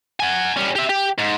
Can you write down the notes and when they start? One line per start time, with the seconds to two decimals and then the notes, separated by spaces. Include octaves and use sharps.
0.20 F#5 G#5
0.57 G3 C#4
0.76 G4 E5
0.89 G4
1.18 G#2